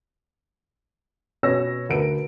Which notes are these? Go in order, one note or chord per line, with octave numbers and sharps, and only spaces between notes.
B2 C#4 B4 C#5 E6 A#6
D2 A#4 B4 D7